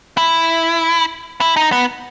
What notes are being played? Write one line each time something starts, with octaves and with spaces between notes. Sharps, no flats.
E4
E4
D#4
B3